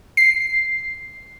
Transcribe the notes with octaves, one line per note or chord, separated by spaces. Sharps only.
C7